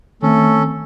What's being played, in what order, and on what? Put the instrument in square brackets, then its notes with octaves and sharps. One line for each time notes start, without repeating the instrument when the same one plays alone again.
[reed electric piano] D#3 C4 [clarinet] A3 [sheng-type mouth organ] C#4 A4